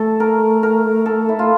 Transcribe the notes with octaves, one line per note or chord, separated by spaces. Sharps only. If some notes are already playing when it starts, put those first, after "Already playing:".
Already playing: A3 A4
A#4
A#4
A4
E4
F4